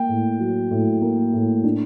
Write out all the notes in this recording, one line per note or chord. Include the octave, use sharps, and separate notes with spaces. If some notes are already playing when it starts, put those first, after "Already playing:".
Already playing: A#3 G5
A2
F#3
A2
A#3
A2
D4